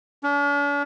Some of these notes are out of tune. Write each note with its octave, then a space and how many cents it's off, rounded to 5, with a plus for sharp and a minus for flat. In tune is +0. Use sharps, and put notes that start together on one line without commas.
D4 -45